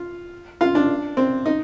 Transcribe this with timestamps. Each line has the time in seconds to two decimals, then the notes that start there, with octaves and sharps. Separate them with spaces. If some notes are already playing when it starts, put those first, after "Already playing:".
Already playing: F4
0.61 F4
0.75 D4
1.17 C4
1.46 D#4